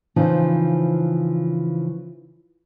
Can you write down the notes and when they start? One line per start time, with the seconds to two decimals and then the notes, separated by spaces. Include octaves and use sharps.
0.16 C#3 E3 F3 C4 D#4